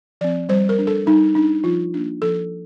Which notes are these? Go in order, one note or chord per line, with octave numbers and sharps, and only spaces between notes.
F3 C4 D5
G3 C5
A#4
D4
A4
G3 D#4
D4 D#4
F3 F4
A#3 D4
F3 A4